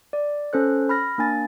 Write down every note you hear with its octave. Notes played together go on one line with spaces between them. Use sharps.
D5
C#4 A4 C5 F#6
B5 F6 A#6
A#3 D4 G#5 A6